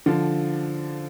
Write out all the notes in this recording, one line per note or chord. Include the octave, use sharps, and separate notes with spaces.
D3 F3